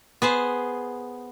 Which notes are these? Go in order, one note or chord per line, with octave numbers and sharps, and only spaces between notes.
B3 G#4 C5